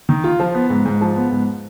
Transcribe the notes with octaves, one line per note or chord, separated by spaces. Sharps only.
D#3
F4
F3
B3
G#2
G#2
F3
B3
G#2